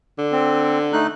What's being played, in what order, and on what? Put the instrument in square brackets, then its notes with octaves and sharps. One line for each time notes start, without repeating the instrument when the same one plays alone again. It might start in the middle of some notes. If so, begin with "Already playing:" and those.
[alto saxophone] D3
[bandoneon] C4
A3 D#4 F#6